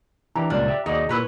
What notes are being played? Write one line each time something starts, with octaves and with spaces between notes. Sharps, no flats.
E3 D4 G4 A#5
C#2 A#2 G3 D4
G4 E5
D#2 D#4 F#4 G#4 D5
A#2 E4 B4 C#5